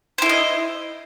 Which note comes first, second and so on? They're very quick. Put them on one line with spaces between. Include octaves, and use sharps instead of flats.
C5 E4 A4 D#5